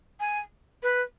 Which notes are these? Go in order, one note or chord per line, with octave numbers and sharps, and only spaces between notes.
G#5
B4